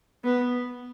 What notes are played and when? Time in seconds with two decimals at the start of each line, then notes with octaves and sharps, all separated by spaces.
0.24 B3